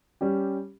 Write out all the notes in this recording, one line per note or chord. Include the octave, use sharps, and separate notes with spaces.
G3 C#4 G4